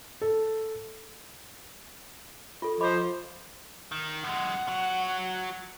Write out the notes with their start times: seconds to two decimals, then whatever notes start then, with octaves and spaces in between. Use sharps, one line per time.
0.21 A4
2.62 F4 A4
2.80 F3 C5 D#5 B5 D6
3.92 D#3
4.24 F#2 G#3 F#5
4.68 F#3 F#4